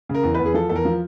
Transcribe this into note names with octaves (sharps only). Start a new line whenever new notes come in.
C#3
A#4
E2
B4
E2
G#4
F3 A4
E2 A4
A#4
F3